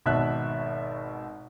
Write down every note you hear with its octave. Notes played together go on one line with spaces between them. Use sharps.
G#1 B2 E5 A5 F#6